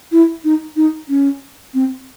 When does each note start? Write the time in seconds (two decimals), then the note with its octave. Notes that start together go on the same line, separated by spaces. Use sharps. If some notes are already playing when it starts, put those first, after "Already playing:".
0.12 E4
0.44 D#4
0.76 D#4
1.09 C#4
1.74 C4